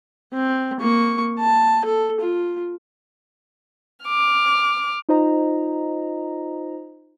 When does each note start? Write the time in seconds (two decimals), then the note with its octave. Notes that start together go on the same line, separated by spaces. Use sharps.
0.33 C4
0.80 A#3 C#6
1.39 A5
1.85 A4
2.21 F4
4.06 D6 F6
5.09 D#4 F4 C5 D#5 A#5